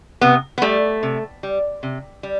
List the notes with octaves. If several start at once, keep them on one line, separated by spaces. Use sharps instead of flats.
C3 B3
B3
G3 A3
C3
G3
C3
G3